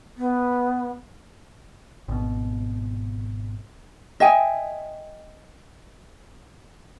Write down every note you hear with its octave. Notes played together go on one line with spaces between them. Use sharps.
B3
G#1 B2
D#5 E5 G5 G#5